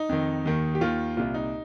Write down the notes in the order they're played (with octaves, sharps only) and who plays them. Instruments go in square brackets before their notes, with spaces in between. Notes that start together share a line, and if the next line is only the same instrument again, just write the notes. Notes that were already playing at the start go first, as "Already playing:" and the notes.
Already playing: [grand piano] D#4
F2 D#3
D#2 D#3
G4
D#2 D#3 F4
C2 A#2 F4
D#4